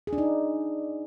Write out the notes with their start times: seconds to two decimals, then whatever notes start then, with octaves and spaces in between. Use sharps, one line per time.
0.07 G#4
0.13 D4
0.18 D#4